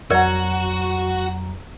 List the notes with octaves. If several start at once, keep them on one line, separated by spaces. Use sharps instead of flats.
F2 F#3 F#4 A#4 D5 F#5 A#5